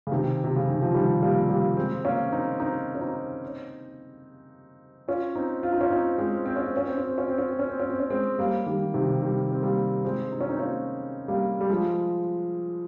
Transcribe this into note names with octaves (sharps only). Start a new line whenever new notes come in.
C#3
C3 D#3
C3
C#3
D#3
F3
D#3 G3
G3 A#3
C4
G3 A#3
G#3 C4
A#3 C#4
C4 D#4
C4 D#4
C#4
C4 D#4
C#4 F4
C4 D#4
F4
D#4
C#4 F4
C4 D#4
G#3 C4
C4
C#4
C4
C#4
C4
C#4
C4
C#4
C4
C#4
C4
C#4
C4
C#4
C4
C#4
G#3 C4
G3 A#3
D#3 G3
C3 D#3
D#3 G3
C4
G3 A#3
G#3 C4
D#4
C#4
C4 D#4
A#3 C#4
G3 A#3
G3
F3 G#3